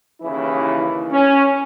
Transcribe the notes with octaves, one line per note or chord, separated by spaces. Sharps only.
D#2 C#3 E3 E4
C#4